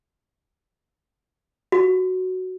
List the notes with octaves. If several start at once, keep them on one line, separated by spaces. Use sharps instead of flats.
F#4